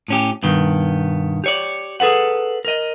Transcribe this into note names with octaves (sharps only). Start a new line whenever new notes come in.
A2 C#4 G4
G2 B2 D#3 B3
G4 C#5 D5
G#4 A4 B4 F#5
A#4 D#5